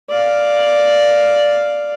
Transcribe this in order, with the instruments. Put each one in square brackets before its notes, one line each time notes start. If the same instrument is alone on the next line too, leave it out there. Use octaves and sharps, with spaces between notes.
[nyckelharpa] D5 F5